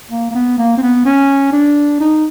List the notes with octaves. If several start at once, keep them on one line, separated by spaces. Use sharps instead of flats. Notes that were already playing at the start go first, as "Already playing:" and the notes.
A#3
A#3
B3
A#3
C4
B3
C#4
D4
D#4